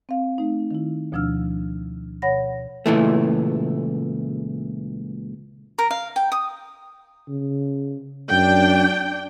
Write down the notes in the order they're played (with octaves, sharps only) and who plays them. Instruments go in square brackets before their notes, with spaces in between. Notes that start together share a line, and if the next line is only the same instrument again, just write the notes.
[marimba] C4 F5
A3 D#4
D#3 E4
D2 B2 F3 D4 E6 F6
B2 C#5 F#5 B5 A#6
[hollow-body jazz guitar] C#2 A#2 E3 A3
[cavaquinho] A#4
F5
G5
D#6
[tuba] C#3
[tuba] F#2 [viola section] D4 G5